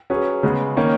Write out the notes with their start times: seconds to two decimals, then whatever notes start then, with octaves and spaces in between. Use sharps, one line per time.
0.10 F#3 C#4 G#4 B4
0.43 C#3 G#3 B3
0.77 D#3 A#3 C#4